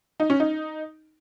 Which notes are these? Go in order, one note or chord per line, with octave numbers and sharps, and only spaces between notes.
D#4
C#4
D#4